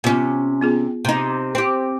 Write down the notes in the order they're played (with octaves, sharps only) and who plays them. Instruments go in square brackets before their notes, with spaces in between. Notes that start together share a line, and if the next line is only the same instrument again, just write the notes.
[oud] C3 C#4 [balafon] B3 F4
[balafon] B3 F4 G#4
[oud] C3 D#4
C4 G4